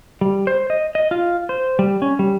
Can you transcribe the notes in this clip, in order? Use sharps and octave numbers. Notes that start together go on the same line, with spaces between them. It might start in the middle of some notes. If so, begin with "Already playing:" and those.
G3
C5
D#5
D#5
F4
C5
G3
C#4
G3